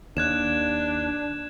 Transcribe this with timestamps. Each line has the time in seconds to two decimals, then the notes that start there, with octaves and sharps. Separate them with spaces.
0.17 D#2 D4 F#6 G#6 E7